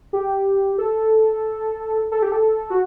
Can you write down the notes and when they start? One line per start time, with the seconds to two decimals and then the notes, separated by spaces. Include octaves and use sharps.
0.13 G4
0.78 A4
2.12 A4
2.22 G4
2.32 A4
2.70 F#4